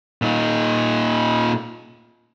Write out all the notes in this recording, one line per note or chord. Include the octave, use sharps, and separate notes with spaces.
A#2 D#4